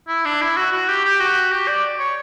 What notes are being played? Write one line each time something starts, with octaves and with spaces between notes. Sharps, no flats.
E4
D4
E4
F#4
F#4
G4
G4
F#4
G4
D5
C#5